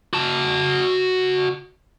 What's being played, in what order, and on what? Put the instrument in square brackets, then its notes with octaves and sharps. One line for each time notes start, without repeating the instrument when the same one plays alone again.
[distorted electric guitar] F#4 A5